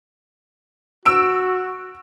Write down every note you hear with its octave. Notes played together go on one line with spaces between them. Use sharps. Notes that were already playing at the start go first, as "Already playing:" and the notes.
F#4 E6 D7